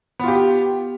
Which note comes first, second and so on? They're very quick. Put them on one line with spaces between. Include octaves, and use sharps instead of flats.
B3 F4 G4